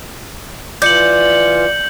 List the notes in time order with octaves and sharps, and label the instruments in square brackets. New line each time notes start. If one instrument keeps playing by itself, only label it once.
[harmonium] E3 F4 [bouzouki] D5 [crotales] G6 C#7 F#7